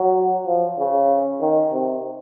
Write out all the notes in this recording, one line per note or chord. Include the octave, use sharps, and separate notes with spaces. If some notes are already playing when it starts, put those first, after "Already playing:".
Already playing: F#3
F3
C#3
D#3
C3